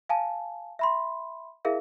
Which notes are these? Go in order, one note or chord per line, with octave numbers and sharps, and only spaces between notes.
F5 G#5 A5
E5 B5 C6
E4 G#4 A#4 E5 F5